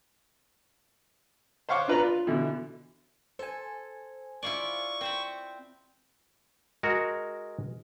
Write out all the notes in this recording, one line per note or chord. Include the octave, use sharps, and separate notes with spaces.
C5 C#5 F5 F#5 C#6 D6
D4 F4 B4 D5 A#5
F4
B2 D3 E3 E4
A4 C5 G#5
E4 F4 D5 C#6
C4 C5 B5
G#3 F#4 A#4